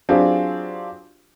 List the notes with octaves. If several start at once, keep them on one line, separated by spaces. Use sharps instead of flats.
F#3 C4 D4 F4 G4 G#4